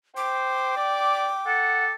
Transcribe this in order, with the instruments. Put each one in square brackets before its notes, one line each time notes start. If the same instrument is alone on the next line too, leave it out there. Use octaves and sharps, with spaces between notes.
[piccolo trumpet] C5 [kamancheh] G5 [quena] D6
[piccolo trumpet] D5
[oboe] A4 [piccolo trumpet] F#5